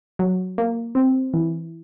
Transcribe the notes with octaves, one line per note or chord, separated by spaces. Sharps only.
F#3
A#3
C4
E3